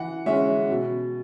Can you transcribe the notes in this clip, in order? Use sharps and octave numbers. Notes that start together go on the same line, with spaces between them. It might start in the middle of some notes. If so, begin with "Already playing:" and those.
Already playing: E3 F#5
G#3 C#4 E5
B2